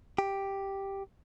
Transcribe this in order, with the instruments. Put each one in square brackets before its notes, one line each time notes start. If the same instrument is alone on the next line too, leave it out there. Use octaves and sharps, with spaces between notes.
[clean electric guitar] G4